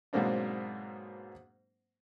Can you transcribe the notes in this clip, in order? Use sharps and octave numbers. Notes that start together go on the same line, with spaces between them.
G#2 B2 F#3 A#3 C4 D4